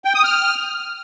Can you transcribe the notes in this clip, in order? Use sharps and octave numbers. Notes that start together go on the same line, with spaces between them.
G5
D#6
F6